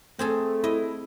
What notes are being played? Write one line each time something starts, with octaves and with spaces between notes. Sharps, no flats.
A3 C4 G#4 A4
E4 D#5